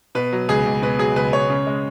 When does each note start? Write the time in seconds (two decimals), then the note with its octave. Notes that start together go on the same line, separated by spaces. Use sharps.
0.15 B2 B4
0.33 F#3
0.49 C#2 G#4
0.65 C#2
0.82 B2 B4
0.99 F#3 G#4
1.16 C#2 B4
1.33 C#2 C#5
1.50 C#3
1.67 G#3